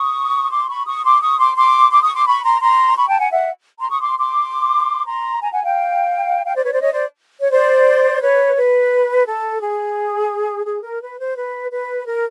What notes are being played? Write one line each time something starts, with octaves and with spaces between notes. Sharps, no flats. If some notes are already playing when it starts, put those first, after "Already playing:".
Already playing: C#6 D#6
C6 D6
B5 C#6
C#6 D#6
C6 D6
C#6 D#6
C6 D6
C6 D6
C6 D6
C#6 D#6
C6 D6
B5 C#6
A#5 C6
A#5 C6
B5 C#6
G5 A5
F#5 G#5
E5 F#5
A#5 C6
C#6 D#6
C6 D6
C6 D6
A#5 C6
G#5 A#5
F#5 G#5
F5 G5
F5 G5
C5 D5
B4 C#5
C5 D5
C#5 D#5
C5 D5
C#5
C5 D5
B4 C#5
B4
A4
G#4
G#4
A#4
B4
C5
B4
B4
A#4